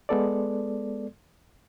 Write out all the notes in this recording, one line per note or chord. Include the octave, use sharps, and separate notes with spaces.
G#3 B3 A4 D5